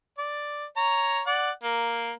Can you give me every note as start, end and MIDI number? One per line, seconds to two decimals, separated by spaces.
0.18 0.65 74
0.77 1.21 73
0.77 1.21 82
1.27 1.51 74
1.27 1.51 78
1.63 2.11 58